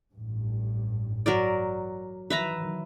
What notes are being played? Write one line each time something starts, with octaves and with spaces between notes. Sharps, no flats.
A1 G2
F#3 A#4 D5
D#3 E3 F#3 B4 E5 A#5